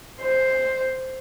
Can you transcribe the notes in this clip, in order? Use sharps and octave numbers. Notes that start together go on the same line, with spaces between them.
C5